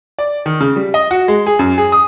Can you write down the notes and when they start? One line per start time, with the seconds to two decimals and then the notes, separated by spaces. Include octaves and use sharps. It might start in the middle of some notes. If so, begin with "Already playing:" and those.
0.19 D5
0.46 D#3
0.61 C#3
0.76 G3
0.94 D#5
1.11 F#4
1.28 G#3
1.46 G#4
1.59 F#2
1.78 G#4
1.92 D#6